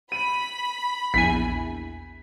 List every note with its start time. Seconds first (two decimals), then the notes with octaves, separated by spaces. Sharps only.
0.12 B5 D#7
1.14 A#1 E2 G#5 B6